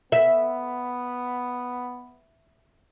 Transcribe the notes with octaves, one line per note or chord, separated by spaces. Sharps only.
B3 E5